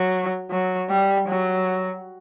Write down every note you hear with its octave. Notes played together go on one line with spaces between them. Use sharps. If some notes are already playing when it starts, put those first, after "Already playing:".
Already playing: F#3
F#3
G3
F#3